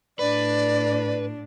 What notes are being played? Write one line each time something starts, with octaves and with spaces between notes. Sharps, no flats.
A2 D4 B4 D5